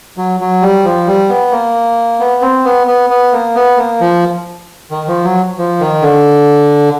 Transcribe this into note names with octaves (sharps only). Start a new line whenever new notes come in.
F#3
F#3
G3
F3
G3
B3
A#3
B3
C4
B3
B3
B3
A#3
B3
A#3
F3
D#3
F3
F#3
F3
D#3
D3